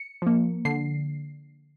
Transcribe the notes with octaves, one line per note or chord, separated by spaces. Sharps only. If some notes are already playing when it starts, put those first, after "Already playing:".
Already playing: C#7
F3 A#3
D3 C7